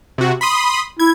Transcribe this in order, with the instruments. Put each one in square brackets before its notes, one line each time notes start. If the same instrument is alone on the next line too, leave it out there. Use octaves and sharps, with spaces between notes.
[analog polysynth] C3 F#4
B5 C6 D#6
[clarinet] E4 [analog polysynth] G#6